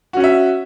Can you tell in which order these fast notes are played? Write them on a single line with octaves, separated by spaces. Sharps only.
F#4 C#4 F#5 E5